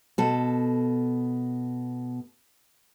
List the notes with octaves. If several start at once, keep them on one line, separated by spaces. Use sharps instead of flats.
B2 A4